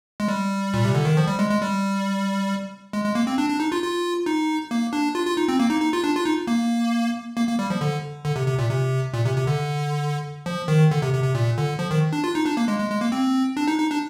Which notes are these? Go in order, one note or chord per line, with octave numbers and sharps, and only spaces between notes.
G#3
G3
A#2
C3
D3
D#3
F3
G3
G#3
G#3
G3
G#3
G#3
A#3
C4
D4
D4
D#4
F4
F4
D#4
A#3
D4
F4
F4
D#4
C4
A#3
D#4
D#4
F4
D4
F4
D#4
A#3
A#3
A#3
G3
F3
D3
D3
C3
C3
A#2
C3
A#2
C3
C3
D3
F3
D#3
D3
C3
C3
C3
A#2
D3
F3
D#3
D4
F4
D#4
D4
A#3
G#3
G#3
G#3
A#3
C4
D4
D#4
D#4
D4